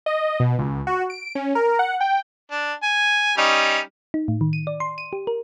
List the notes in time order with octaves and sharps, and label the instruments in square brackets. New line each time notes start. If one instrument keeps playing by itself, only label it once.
[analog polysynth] D#5
B2
C#2
F#4
D7
C#4
A#4
F#5
G5
[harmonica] D4
G#5
G3 C#4 D#4
[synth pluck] D#4
A2
D#3
D#7
D5
C6
D#7
G4
A#4